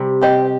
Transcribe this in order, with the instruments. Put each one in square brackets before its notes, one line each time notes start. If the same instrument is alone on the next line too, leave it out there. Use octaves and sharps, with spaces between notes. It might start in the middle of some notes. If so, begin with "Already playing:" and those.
Already playing: [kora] C3 G3
[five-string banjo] C4 G4 C5 D#5